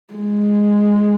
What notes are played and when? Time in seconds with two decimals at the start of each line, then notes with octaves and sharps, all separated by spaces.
0.14 G#3